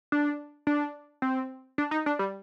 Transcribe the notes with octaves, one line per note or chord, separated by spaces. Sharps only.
D4
D4
C4
D4
D#4
D4
G3